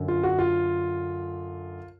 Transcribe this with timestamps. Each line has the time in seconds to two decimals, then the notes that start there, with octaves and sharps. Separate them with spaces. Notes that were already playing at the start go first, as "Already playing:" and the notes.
Already playing: F#2 D3
0.08 F4
0.23 F#4
0.39 F4